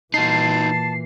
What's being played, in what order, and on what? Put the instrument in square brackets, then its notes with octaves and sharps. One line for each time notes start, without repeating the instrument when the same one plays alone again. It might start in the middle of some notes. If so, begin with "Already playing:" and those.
[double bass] A#2 E3 [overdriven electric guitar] D#4 F#4 [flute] A5 [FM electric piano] C7